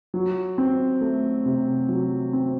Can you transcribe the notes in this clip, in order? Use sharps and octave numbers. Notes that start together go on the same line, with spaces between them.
F#3
C4
A3
C3
F#3
C4